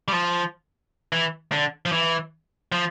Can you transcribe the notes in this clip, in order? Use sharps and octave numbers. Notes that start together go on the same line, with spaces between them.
G3
F3
E3
D3
F3
E3
F3